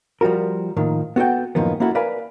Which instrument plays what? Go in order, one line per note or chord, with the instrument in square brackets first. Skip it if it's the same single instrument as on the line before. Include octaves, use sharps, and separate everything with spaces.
[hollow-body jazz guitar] F3 G3 F4 F#4 A#4
A2 D#3 F3 A#3
B3 F#4 A4 G5
F#2 A2 D#3 F3 A#3 B3
A#3 C#4 E4 F#4 A4
A#4 B4 D5 F5 G#5 B5